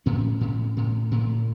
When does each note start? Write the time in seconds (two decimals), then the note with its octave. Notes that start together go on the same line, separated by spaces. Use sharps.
0.06 A2 C#4
0.41 A2
0.77 A2
1.11 A2